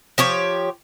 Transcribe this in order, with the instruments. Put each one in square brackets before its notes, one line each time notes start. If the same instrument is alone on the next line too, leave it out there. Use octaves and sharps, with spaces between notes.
[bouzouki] F3 G4 C#5